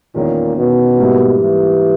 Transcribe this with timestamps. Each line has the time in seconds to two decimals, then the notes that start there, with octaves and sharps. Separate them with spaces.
0.15 E2 A#2 D#3 G#3 C#4
0.57 B2
0.98 G#2 G3 A#3 E4
1.40 E3